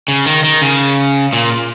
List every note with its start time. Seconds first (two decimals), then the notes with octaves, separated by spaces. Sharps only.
0.08 C#3
0.26 D#3
0.44 D#3
0.62 C#3
1.33 A#2